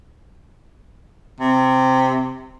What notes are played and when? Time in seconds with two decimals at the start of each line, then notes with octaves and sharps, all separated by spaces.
1.40 C3